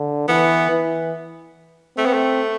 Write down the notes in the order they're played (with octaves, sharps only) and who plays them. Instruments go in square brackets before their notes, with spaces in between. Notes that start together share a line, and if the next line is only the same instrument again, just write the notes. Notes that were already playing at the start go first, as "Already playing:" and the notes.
Already playing: [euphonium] D3
[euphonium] E3 [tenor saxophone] B3
[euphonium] E3
[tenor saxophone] A3 [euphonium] C4
[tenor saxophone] B3
A3